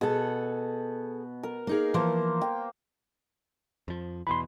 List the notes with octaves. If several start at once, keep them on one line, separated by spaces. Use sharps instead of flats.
B2 G#4 A4 F#5
A#4
A#3 D#4 G#4
E3 F3 A#3 C5
G5
F2 F3
E2 B2 E3 B5 C6